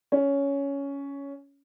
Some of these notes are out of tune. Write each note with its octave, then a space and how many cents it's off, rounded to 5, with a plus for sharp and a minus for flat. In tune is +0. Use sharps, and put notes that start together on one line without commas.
C#4 +10